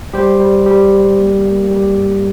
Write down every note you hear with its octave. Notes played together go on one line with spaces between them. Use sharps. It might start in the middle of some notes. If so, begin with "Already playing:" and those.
G3 G4 C5
G3
G3 G4
G3
A#3
A#3
G3 G4
G2